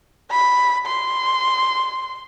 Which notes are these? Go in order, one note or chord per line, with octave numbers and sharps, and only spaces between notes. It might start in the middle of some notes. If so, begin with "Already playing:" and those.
B5
C6